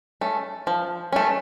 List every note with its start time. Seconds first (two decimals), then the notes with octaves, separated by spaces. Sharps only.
0.21 A3 C#4
0.67 F3
1.12 A3 C#4